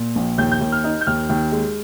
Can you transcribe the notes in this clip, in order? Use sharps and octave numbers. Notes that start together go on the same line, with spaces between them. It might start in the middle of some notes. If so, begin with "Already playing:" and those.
Already playing: A#2
A#1
D#2 G6
G6
D#2
F6
D#4
G6
D#2 F6
D#2
G#3